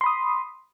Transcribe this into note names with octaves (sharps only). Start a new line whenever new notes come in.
B5 C6 D#6